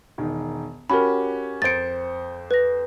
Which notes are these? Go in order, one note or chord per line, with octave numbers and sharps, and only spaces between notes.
E1 D#3
C#4 F#4 G4 A#4 B5
F2 C5 A6 C#7 D7
B4 A#6